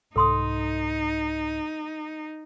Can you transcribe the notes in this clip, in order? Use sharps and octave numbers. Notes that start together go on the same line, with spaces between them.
C2 G#2 D#4 A4 C6 D#6